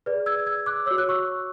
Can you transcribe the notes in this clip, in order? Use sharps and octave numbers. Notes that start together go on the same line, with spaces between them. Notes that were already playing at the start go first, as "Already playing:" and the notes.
G#4 B4 D5
E6 G#6
E6 G#6
D6 F#6
F#4 C#5 E6
F#6
C#6 E6